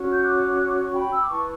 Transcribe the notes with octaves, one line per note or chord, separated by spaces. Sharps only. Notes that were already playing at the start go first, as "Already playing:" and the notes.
Already playing: C#4 F#4 C#5
G6
D6 F#6
C#6
G5 B5
E6
D6
E4 B4 A5 C#6